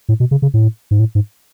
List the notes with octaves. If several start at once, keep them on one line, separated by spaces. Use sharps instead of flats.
A2
B2
C#3
C#3
A2
G#2
A2
G#2